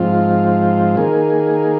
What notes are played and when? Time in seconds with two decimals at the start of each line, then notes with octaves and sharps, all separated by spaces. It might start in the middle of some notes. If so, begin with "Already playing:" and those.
Already playing: G#2 F3 C4 F4
0.97 D#3 A#3 G#4